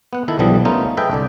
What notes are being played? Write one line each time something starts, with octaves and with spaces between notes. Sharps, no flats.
B3 F#5
D#3 E4 A4
B1 D3 E3 F3 G3 D#5
A3 B3 C#4 D#4 F4 A#4
G#4 A4 B4 D#5 E5 G5
C2 D3 D5